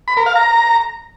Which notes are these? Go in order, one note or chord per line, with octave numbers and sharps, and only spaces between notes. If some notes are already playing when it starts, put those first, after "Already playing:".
B5
A#4
F5
A#5